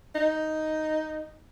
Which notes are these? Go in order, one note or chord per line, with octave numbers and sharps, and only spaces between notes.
D#4